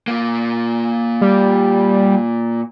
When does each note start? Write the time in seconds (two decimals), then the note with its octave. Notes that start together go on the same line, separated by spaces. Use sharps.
0.08 A#2 A#3
1.21 G3